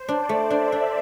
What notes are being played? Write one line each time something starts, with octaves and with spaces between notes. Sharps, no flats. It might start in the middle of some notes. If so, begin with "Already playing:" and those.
Already playing: C5
D4 D5
A3
D4 E5
D4